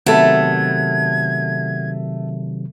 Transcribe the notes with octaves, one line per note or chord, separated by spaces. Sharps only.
C3 D#3 F#3 A3 B3 A4 G#6